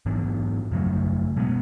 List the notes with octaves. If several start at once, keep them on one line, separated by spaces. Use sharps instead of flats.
G#2 E3 B3 D4
F#2 C#3 F#3 A3
B2 G#3 B3